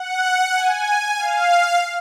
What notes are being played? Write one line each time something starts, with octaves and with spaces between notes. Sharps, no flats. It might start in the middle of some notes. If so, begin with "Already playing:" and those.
Already playing: F#5
G#5
F5